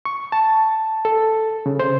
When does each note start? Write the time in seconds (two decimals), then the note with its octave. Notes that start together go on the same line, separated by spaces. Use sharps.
0.05 C#6
0.32 A5
1.05 A4
1.66 C#3
1.79 C5